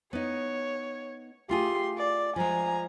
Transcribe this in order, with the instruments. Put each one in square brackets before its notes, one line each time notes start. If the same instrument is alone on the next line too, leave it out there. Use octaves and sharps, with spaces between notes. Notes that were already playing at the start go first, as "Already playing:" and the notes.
[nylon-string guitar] B3 D#4 [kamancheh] C#5
[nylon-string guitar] A3 F4 G#4 [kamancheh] G4 C6
[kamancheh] D5
[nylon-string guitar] F3 G#3 [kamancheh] G#5 A#5